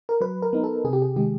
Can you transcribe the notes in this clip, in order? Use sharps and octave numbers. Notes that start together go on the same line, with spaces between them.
A#4
F#3 B4
A#4
B3 D#4
A4
C3 G#4
G4
G#4
D#3 G#3 G4